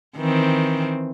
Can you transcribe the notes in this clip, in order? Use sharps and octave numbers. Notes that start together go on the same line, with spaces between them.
D#3 E3 C4